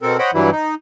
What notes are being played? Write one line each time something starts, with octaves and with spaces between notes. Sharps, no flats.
B2 C4 A4 A#4
C5 C#5 D#5 F#5 G5 B5
G2 E3 F#3 G3 E4
D#4